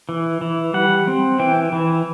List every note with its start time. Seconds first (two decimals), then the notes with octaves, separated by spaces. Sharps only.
0.09 E3
0.41 E3
0.74 G3 F#5
1.07 C4
1.39 E3 G5
1.72 E3